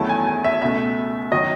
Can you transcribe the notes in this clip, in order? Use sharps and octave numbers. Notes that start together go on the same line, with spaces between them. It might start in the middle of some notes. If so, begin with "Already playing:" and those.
Already playing: E2 D#3 F#3 A3 E4 A5
G#5
G#5
E5
C#2 B2 A3 E5
D#3 F#3 D#5